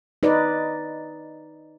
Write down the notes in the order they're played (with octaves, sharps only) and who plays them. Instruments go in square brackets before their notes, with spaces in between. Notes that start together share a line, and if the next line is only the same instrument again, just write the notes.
[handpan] D#4 B4 D5 D#5